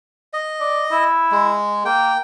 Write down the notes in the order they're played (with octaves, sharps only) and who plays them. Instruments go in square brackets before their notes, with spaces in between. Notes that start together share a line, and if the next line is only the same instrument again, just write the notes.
[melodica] D#5
[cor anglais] D5
E4
[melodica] G#3
[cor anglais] A#3 [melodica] G5